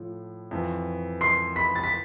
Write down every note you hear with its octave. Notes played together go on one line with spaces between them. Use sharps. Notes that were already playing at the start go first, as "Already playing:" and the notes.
Already playing: A2 F3
F2 E3
C6 C7
B5 B6
A6
B6